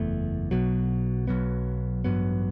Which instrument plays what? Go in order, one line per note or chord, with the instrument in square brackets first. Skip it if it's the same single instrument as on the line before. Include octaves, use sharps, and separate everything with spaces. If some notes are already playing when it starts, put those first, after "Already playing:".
Already playing: [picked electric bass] F#1 E2 A3
B1 B2 F#3
B1 B2 F#3 B3
A1 G2 F#3 B3